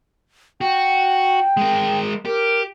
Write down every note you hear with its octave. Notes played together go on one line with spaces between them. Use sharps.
F#4 G5
G#3 A#4
G4 A#4